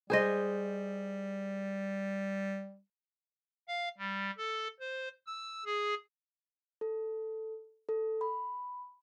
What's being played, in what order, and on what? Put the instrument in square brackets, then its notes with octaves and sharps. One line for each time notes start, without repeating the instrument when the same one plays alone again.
[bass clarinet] G3 [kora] G#4 C5 D#5
[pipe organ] F5
G3
A4
C5
E6
G#4
[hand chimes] A4
A4
B5